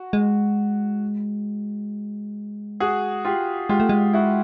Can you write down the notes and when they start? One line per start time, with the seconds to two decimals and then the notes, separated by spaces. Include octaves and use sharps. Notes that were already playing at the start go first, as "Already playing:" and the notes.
Already playing: F#4
0.13 G#3
2.80 F#4 G#4
3.25 F4 G4
3.69 G#3 F4 G4
3.80 A3
3.89 G#3
4.13 E4 F#4